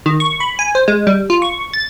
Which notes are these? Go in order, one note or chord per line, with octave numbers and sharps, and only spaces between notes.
D#3
C#6
B5
G#5
C5
G#3
G3
F4
C#6
A6